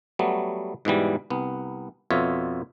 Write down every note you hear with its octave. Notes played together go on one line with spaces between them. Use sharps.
F#3 G3 A3 B3
G#2 B2 E3 G3
C2 B3
F2 B2 F4 C#5 E5